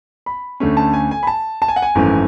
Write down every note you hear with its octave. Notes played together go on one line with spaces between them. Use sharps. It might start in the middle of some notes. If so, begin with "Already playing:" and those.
B5
D2 D3 A3 C#4
A5
G#5
G#5
B5
A5
A5
G#5
F#5
G#5
G#1 F#2 E3 A3 C#4